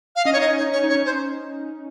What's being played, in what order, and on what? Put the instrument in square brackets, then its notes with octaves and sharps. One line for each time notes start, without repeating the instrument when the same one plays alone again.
[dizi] F5
[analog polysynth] C#4 [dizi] D#5
[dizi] C#5
[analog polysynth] D#4 [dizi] D#5
[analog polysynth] C#4
[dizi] C#5
[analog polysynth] D#4
[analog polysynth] C#4 [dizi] C#5
[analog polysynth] D#4
[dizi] C#5
[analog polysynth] C#4
[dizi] C5